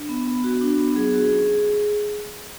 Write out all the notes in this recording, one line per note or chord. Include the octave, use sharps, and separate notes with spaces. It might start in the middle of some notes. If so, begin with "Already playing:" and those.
Already playing: D4
B3
B3
F#4
D4
B3
F#3 G#4
F#4
C#4